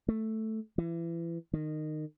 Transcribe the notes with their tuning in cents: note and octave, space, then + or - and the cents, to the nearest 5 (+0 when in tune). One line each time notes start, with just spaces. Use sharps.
A3 +0
E3 +30
D#3 -20